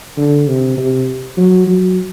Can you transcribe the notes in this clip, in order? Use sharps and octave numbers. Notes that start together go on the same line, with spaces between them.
D3
C3
C3
F#3
F#3